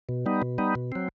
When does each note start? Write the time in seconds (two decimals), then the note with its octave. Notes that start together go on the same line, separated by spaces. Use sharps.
0.09 B2
0.26 G3 B3 D#4
0.42 B2
0.58 G3 B3 D#4
0.75 B2
0.92 F#3 C4